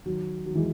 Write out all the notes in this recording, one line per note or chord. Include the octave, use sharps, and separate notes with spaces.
D#3 F#3
D#3 F#3
E3 G#3